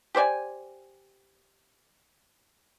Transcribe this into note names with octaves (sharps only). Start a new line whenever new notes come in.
G4 C5 D5 G#5